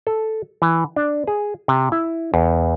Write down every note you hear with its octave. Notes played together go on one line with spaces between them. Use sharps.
A4
E3
D4
G#4
C3
E4
E2